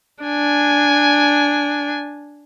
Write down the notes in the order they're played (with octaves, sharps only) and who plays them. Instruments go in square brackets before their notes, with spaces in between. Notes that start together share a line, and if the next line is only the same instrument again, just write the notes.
[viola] D4 G#5